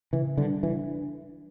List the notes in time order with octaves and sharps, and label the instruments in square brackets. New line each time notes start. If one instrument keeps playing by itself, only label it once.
[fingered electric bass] C#3 [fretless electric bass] E3
[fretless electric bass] D3 [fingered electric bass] G3
[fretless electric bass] E3 [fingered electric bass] D4